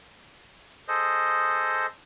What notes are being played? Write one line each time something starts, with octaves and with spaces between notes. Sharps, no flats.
G#4 A4 C5 D#5